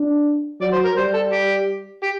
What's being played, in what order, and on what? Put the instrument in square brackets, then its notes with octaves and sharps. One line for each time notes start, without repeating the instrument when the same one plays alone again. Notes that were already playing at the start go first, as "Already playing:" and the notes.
Already playing: [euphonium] D4
[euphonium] F#3 [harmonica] D5
[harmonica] C5
A#4
[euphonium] G3 [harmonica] C5
[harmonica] A4
G4
G4